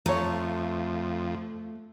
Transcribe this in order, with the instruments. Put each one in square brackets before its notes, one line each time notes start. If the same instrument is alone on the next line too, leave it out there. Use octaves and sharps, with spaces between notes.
[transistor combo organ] F2 [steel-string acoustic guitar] A3 [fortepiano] C#5 A#5